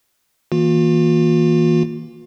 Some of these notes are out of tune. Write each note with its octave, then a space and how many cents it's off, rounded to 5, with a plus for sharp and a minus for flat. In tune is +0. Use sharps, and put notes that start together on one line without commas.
E3 -30 A#3 +0 F4 +45